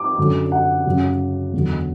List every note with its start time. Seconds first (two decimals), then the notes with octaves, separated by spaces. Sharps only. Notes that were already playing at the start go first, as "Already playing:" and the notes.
Already playing: D6
0.18 F#2 D3 F#3
0.52 F#5
0.86 F#2 C#3 F#3
1.53 E2 D3 F#3